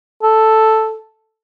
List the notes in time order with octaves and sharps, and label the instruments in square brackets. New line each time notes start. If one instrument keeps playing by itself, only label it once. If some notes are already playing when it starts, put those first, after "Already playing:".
[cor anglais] A4